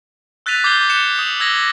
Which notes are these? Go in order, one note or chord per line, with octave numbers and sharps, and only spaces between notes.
E6 F#6 A6 B6 D#7 F7
D6 G6 G#6 C7 G7
F#6 C#7 E7 G7
D#6 F7
E6 G#6 A#6 F#7 G7